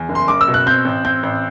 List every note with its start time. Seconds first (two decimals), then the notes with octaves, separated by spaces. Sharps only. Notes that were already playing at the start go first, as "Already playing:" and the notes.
Already playing: E2
0.09 F#1
0.15 C6
0.28 F#1 D6
0.41 E6
0.48 B2
0.54 F#6
0.67 C4 G6
0.85 A1
1.04 C4 G6
1.23 A1